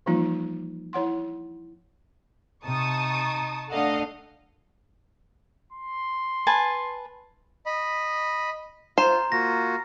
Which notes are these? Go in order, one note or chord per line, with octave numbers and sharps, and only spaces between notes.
E3 F3 G3 A#3 D#4 F4
E4 C#5 F#5 C6
C3 D#4 A5 C#6 D#6
A3 D4 D#5 F5 F#5
C6
B4 G#5 A5
D#5 B5
F4 C5 A#5
A#3 F4 F#4 A#6